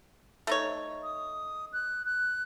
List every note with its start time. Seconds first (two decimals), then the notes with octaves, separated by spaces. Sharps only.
0.47 A3 D#4 C#5
1.03 D#6
1.73 F#6
2.06 F#6